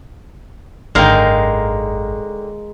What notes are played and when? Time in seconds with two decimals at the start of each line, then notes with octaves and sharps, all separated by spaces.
0.95 G#1 F#2 D3 D#3 G#3 A#4 F5 G5